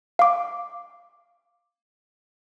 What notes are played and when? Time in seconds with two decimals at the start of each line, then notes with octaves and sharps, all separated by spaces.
0.19 F5 D6